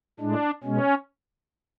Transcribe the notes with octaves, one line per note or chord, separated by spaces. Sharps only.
A2 G#3 D4
B2 G#3 C#4